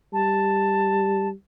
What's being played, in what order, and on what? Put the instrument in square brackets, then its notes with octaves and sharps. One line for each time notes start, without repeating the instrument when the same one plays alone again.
[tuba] G3 [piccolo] A5